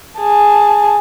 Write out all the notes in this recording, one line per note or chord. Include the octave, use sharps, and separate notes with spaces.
G#4 A5